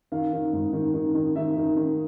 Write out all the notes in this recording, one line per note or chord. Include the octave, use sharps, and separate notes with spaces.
D#3 F5
D#3
G#2
D#3
D#3
D#3
D#3 E5
D#3
D#3